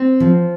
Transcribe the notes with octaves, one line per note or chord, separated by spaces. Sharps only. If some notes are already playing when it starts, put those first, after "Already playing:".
Already playing: C4
F3